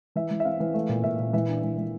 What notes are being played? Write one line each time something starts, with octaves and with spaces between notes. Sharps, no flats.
E3 E5
E3
E5
C4 F5
E3
A3
A#2
A#2 E5
A#2
E3 E5
D4
E3
E3